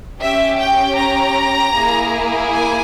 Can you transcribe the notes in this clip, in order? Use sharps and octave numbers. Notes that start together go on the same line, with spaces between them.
C#4 G4 E5
G5
A#5
A#3 E4 G#4
G#5